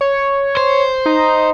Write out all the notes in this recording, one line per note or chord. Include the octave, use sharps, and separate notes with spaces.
C#5
C5
D#4